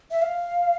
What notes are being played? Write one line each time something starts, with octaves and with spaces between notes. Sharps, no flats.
E5
F5